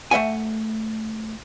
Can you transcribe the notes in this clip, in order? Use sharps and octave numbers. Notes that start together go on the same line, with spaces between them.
A3 E5 F#5 G#5